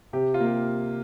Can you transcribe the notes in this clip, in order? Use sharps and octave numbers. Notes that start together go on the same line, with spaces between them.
C3 G4
F4
A#3 G4